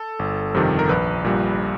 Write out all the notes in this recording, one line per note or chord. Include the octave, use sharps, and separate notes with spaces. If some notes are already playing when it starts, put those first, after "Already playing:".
Already playing: A4
G1
F2 C3 D#3 G3
A#4
A#1 B4
A#2 G3